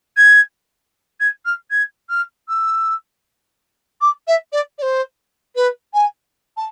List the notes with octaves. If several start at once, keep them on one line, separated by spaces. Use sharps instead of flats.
G#6
G#6
F6
G#6
F6
E6
D6
E5
D5
D5
C5
B4
G#5
A5